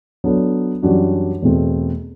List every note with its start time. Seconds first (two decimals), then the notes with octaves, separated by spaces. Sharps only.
0.24 F#3 B3 D4 A4
0.83 F#2 E3 G3 D4 F#4
1.42 E2 B2 A3 C4